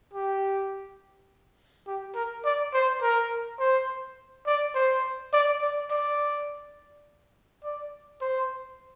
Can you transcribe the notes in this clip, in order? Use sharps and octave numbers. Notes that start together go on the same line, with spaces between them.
G4
G4
A#4
D5
C5
A#4
C5
D5
C5
D5
D5
D5
D5
C5